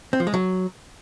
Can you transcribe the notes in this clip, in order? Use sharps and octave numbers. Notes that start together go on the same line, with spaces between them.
C4
F3
G#3
F#3